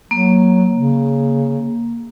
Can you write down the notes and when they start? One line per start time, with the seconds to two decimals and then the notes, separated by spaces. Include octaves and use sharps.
0.11 F#3 A#3
0.73 C#3